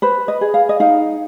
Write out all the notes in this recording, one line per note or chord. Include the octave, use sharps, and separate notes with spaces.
B4 C5
D#5
G#4
F5
D#5
D#4 F5